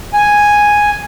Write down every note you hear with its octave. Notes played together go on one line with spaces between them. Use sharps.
G#5